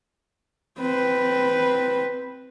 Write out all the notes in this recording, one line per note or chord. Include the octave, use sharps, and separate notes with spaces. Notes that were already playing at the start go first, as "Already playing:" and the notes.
C4 B4